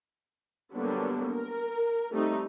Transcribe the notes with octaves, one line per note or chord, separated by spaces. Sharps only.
D3 F#3 G3 A#3 B3 D4
A#4
G3 A3 C4 D#4